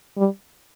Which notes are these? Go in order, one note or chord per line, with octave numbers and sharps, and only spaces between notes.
G3